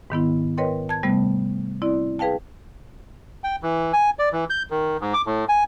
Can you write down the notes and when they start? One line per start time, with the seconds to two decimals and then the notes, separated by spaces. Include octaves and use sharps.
0.10 G#2 D#3 B3 E4
0.58 A#4 B4 C#5 D#5 G5 C6
0.89 A5 G#6
1.03 C3 G3 A3 B3
1.82 C4 E4 D5
2.19 G#4 B4 F5 G5 A5
3.44 G5
3.63 E3
3.93 G#5
4.19 D5
4.32 E3
4.50 G6
4.70 D#3
5.01 G#2
5.14 D6
5.26 A2
5.49 G#5